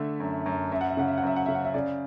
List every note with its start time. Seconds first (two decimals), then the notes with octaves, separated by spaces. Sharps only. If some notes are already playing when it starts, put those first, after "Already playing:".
Already playing: D3 A3 E5
0.20 F#2
0.46 F#2
0.72 F#2 E5
0.81 F#5
0.90 E5
0.97 C#3 F#5
1.08 E5
1.18 F#5
1.23 F#2 E5
1.36 F#5
1.46 C#3 E5
1.55 F#5
1.65 E5
1.74 C#3 D5